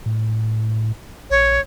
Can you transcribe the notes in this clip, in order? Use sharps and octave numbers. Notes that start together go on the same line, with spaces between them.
A2
A#1 C#5